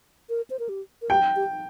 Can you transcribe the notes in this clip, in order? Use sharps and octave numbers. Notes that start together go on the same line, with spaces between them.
A#4
C5
A#4
G4
A#4
G4 G5
G4